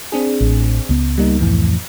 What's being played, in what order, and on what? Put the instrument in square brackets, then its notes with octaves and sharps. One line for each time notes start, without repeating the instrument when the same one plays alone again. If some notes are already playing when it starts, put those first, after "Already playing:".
[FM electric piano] C4 D4 G#4
[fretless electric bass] A1
C#2 B3
[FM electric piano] G3 A#3 D#4
F2 A2 E3